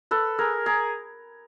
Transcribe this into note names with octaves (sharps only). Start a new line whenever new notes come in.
A4 B4
G#4 A#4
G#4 A#4